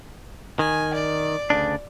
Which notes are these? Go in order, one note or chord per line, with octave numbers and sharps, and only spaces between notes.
D#3 G#5
D5
D2 C#3 D4